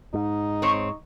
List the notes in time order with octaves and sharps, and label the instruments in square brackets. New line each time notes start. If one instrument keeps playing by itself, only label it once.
[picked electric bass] G#2 [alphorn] D#4
[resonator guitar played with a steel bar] C4 C#5